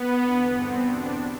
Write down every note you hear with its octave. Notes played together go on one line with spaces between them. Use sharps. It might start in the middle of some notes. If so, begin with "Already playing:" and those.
Already playing: B3
D3
E2
G2 D3 C4
E2 B2 D4